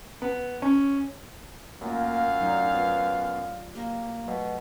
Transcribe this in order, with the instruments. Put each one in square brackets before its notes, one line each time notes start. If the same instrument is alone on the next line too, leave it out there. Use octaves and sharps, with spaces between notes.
[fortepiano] B3
C#4
[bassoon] F#2 [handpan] A3 F4 [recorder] A#3 [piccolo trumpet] F5
[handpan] F#3 D5 [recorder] D#4
[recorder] B3 [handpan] F4
[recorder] A#3 [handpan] G4
[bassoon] B2 [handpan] F#3 A3